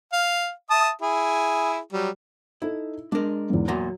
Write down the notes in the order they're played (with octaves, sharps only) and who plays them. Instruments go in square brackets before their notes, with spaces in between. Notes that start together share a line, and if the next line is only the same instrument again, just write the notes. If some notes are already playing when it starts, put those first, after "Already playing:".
[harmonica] F5
E5 A5 D#6
E4 G#4
F#3 G3
[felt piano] D#4 A4 [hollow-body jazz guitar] E4
[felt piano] G#3 [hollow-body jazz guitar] D4 A#4
[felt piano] E2 G#2
[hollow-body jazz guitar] E2 A#2 A#5 [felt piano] F#3